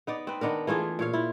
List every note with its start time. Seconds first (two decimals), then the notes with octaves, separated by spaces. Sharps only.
0.07 B3 D#4 D5
0.27 C4 B4
0.41 D#3 B3 D4 A#4
0.67 E3 A3 F4 G#4
0.99 A#2 C#5 F5
1.13 E4 F4